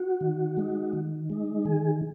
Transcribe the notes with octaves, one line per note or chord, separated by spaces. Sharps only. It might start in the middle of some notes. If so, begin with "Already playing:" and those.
Already playing: F#4
D#3
G#3 D#4
D#3
G#3 D#4
D#3 G#4